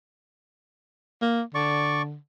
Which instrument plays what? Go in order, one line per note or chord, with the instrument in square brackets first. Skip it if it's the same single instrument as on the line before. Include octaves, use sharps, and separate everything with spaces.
[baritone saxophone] A#3
[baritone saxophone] D3 [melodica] D5 C#6